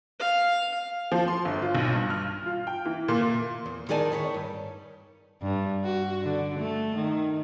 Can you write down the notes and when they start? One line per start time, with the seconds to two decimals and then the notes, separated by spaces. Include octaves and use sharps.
0.19 F5
1.12 F3
1.28 C6
1.45 G1
1.62 F4
1.75 B1
1.93 G2
2.10 F6
2.46 F4
2.67 G5
2.86 E3
3.08 A#2
3.21 A#2
3.66 E2
3.89 D#3 D#4 G#4 D5 G#5 A5
4.12 D#3 B4 C#5
4.34 G2
5.42 G2
5.84 F#4
6.23 D3
6.59 A3
6.95 D#3